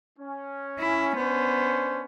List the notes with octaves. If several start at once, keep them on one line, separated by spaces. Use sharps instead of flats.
C#4
E4
B3 C#4 D4 C5